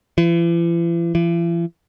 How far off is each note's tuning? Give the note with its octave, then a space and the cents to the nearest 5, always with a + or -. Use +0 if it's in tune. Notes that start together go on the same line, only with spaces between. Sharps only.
E3 +45
E3 +45